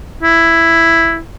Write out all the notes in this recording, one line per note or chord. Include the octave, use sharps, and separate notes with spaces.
E4